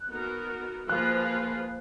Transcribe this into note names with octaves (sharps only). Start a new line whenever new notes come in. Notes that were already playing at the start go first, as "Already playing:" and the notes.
Already playing: F#6
B3 D#4 F#4 A#4
F3 A#3 F4 G#4 B4 F#6